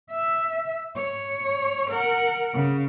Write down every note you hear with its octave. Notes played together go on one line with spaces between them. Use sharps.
E5
C#5
A#4 F#5
C#3